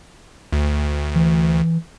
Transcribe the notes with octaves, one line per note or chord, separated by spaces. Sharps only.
D2
E3